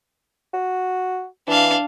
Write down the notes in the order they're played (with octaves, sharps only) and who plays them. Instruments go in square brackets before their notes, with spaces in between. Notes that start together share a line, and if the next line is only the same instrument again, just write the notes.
[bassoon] F#4
[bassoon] E3 [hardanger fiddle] D4 F5